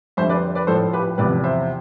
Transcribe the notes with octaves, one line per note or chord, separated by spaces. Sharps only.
F2 D3 G3 C5 E5
B4 D5
B4 D5
A2 F3 A4 C5
G4 B4
E2 C3 F3 B4 D5
C5 E5